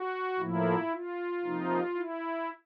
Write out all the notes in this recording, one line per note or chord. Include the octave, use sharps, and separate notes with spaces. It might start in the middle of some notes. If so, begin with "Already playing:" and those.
Already playing: F#4
A2 F3 A#3 E4
F4
C3 F3 A#3 D#4
E4